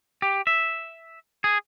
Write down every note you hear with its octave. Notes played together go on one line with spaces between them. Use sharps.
G4
E5
G#4